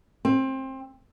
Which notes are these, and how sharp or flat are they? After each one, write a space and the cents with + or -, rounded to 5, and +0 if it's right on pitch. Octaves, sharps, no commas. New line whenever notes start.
C4 +25